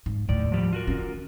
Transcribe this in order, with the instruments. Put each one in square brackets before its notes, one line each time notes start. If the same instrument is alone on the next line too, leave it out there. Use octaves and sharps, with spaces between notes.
[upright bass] G#2
[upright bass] D#2 A2 [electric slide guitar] D#3 D5
[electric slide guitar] F3 G3
F4 F#4 A#4
[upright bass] D#3 C#4